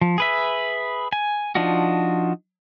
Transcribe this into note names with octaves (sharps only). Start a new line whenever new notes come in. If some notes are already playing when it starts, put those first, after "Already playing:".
F3
G#4 B4 E5
G#5
F3 D4 D#4 F4 F#4